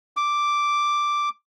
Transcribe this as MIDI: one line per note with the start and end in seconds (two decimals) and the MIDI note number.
0.17 1.29 86